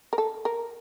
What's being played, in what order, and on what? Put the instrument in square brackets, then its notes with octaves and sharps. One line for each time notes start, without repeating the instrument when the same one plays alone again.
[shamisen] A#4
A4
A#4